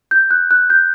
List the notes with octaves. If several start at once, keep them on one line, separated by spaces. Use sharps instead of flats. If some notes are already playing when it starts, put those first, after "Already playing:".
G6
F#6
F#6
G6